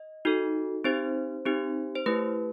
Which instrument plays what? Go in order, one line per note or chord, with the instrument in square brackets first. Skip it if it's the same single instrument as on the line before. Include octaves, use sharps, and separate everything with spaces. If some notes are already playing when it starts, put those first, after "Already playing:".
Already playing: [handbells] D#5
D#4 F#4 A4
C4 D#4 G4 C5
C4 D#4 G4
C5
A3 E4 G4 B4